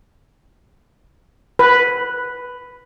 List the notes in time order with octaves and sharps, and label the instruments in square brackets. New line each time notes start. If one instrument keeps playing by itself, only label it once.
[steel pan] B4